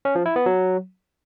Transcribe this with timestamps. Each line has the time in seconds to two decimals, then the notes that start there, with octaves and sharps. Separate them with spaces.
0.05 C#4
0.15 F3
0.26 E4
0.36 B3
0.46 F#3